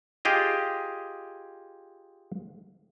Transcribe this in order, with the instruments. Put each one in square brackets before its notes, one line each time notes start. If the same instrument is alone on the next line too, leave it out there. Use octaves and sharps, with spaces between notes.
[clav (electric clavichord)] F4 G4 G#4 D#5